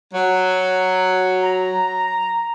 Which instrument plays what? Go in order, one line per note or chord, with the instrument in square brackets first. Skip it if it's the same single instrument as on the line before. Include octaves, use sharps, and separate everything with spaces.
[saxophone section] F#3
[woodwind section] A#5